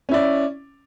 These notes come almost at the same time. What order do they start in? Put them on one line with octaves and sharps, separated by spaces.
C#4 E4 D5